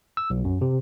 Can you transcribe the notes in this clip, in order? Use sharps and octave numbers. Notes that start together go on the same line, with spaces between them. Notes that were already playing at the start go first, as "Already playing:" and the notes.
E6
B1
F#2
C3